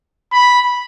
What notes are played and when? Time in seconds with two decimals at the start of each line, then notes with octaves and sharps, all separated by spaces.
0.33 B5